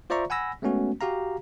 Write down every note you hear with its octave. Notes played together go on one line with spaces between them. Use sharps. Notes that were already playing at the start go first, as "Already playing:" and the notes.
F4 C5 D5 E5 A#5 C#6
F#5 G#5 B5 E6 A#6
G#3 A3 B3 C#4 F#4
F#4 G4 F5 A#5